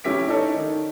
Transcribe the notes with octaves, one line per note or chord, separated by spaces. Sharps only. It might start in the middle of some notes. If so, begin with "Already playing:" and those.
F1 C#4 E4 G4 B6 D7
D4 D#4 A4 C#5
D#3